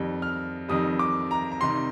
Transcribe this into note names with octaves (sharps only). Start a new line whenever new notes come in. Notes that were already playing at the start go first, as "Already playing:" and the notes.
Already playing: F2 D#3 G3
F6
F2 D#3 G3 D#6
D6
A#5
A#5
C3 D#3 G3 C6